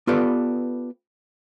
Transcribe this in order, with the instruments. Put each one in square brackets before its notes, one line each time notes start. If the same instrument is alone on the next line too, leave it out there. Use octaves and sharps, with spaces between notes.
[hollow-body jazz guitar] B3 F4 G4 A4 B4 D5